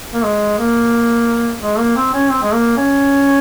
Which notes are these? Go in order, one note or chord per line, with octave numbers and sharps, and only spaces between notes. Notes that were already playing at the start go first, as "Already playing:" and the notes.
A#3
G#3
A#3
G#3
A#3
C4
C#4
C4
G#3
A#3
C#4